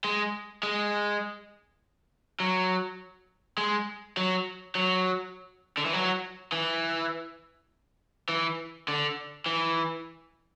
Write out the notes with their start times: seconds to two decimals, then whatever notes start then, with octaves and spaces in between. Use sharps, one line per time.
0.04 G#3
0.63 G#3
2.40 F#3
3.58 G#3
4.17 F#3
4.75 F#3
5.77 D3
5.85 E3
5.93 F#3
6.52 E3
8.29 E3
8.88 D3
9.46 E3